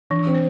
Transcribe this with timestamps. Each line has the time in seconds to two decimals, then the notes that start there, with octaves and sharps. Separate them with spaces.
0.10 E3 D4
0.27 C4
0.34 C5